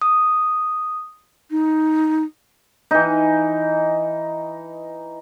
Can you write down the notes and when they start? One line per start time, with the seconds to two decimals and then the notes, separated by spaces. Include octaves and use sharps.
0.02 D#6
1.51 D#4
2.91 E3 D#4